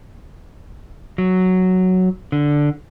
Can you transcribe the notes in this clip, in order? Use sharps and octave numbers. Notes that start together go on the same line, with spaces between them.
F#3
D3